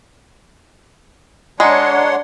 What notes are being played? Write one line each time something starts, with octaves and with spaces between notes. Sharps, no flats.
G#3 D4 C#5 D#5 F#5 A#5 C6